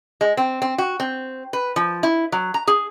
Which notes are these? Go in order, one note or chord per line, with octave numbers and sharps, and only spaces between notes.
G#3
C4
C4
F#4
C4
B4
F3
E4
F#3
A#5
G#4